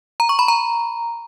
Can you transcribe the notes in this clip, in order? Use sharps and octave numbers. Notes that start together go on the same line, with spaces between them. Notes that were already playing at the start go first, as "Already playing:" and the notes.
A#5
C#6
B5
A#5